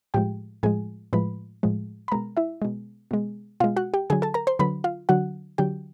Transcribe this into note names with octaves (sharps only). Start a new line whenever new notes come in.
A2 F3 G#3 G4 G5
A2 F3 G#3 G#4 G#5
A2 F3 G#3 B4 B5
A2 F3 G#3
B5
B2 G#3 A#4 A#5
E4 E5
B2 G#3
B2 G#3
B2 G#3 F4 F5
F#4 F#5
G4 G5
D3 F#3 G#4 G#5
A4 A5
A#4 A#5
C5 C6
D3 F#3 B4 B5
F4 F5
D3 F#3 F#4 F#5
D3 F#3 G4 G5